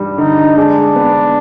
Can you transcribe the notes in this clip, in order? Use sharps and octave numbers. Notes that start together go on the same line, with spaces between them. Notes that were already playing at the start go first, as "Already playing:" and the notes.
Already playing: G2 G3
D3 D#4
G#3 D4
B3